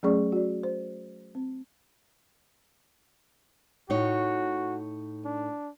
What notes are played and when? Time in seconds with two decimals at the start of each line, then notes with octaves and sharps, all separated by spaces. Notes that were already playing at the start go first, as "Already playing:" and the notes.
0.03 F#3 A3 C#4 G#4 D5 C#6
0.32 F#4 D5
0.63 C5
1.35 C4
3.90 A2 D#4 F#4 C#5
5.25 D4